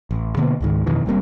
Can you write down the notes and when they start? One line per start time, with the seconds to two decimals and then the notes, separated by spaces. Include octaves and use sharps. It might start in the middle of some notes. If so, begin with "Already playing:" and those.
0.11 A1
0.37 B2 D3 A#3 B3
0.60 C#2 G#2 D#3
0.86 F2 B2 D#3 E3
1.06 F#1 G3 A#3 C4